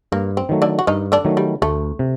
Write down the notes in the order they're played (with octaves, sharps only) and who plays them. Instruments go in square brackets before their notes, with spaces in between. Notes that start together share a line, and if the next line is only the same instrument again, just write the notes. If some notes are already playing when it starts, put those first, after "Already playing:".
[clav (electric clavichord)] G2 [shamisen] A#3
[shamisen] C4
[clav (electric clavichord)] D#3 F#3 A3
[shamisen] D3 D4
F#4
[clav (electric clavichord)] G2 [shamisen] D#3 D#4
[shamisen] D3 D4
[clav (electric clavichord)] D#3 F#3 A3
[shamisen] G3
[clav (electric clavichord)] D2 [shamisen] A3
[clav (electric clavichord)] C3